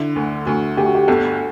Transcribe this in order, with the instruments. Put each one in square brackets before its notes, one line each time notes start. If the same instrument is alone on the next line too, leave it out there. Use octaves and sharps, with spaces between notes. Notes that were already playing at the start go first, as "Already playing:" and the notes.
Already playing: [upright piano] D3 [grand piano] E4
[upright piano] D2
[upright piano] D2 [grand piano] F#4
[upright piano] D2 [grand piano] G4
[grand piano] F#4
G4
[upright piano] G1 [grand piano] A4